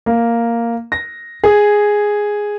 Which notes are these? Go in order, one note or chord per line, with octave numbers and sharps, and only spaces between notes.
A#3
A#6
G#4